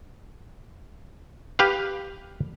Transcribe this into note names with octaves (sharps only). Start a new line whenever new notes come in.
G4 B4 F5